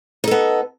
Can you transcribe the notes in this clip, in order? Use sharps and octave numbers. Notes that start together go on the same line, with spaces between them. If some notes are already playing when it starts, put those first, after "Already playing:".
B3 D#4 A4